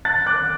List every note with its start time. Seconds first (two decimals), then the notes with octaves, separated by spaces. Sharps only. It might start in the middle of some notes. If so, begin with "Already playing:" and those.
0.05 F#6 A6
0.26 D6 F#6